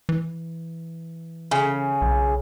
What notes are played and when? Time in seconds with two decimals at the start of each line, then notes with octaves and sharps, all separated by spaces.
0.09 E3
1.51 C#3
2.02 B1